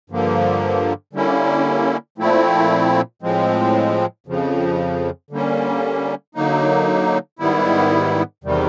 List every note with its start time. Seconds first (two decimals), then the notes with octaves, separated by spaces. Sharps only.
0.10 G2 D3 F3 A#3
1.13 D3 G3 A#3 C#4 E4
2.18 A#2 F3 A3 C4 E4
3.22 A2 F3 G#3 C4
4.27 F2 C#3 F3
5.31 D3 G3 A#3 C#4
6.35 D3 F#3 A#3 D#4
7.39 G#2 D#3 G3 B3 E4
8.44 E2 C3 D#3 G3